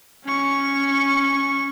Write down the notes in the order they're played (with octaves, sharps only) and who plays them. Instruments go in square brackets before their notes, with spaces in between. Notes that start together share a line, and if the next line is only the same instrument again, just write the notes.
[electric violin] C#4 C#6